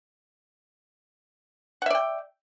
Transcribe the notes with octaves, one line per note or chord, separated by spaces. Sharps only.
D5 E5 F#5 G5